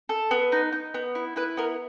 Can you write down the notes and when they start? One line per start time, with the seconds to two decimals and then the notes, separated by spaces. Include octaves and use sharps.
0.09 A4
0.31 B3
0.52 D#4
0.72 D#4
0.94 B3
1.15 E4
1.36 E4 B4
1.57 B3 A#4